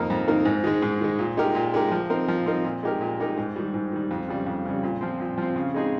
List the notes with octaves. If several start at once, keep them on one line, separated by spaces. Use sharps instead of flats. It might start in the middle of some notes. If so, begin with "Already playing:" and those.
Already playing: F2 D#3 A#3 D#4 A#4
F2
D#3 A#3 D#4 A#4
G#2
D#3 G#3
G#2
D#3 G#3
A#2
G#3 D#4 G4 A#4
A#2
G#3 D#4 G4 A#4
F3
C4 D#4 A#4
F3
C4 D#4 A#4
A#2
G#3 D#4 G4 A#4
A#2
G#3 D#4 G4 A#4
G#2
D#3 G3
G#2
D#3 G3
F2
C#3 G3
F2
C#3 G3
A#2
F3 C4
A#2
F3 C4
C#3
G#3 C4 D#4 G#4